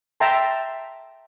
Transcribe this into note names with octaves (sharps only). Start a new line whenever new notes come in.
E5 G5 A5 A#5 C6